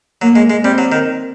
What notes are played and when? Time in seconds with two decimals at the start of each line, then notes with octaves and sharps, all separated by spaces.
0.22 F#3 A#3
0.36 G#3
0.50 G#3
0.63 G3 C4
0.78 F#3
0.92 D#3